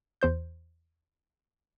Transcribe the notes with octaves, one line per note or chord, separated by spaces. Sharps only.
E2 C5 G6